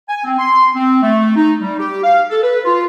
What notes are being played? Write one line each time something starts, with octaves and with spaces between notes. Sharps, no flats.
G#5
C4
C6
C4
A3
D#4
G3
G4
F5
A4
B4
F4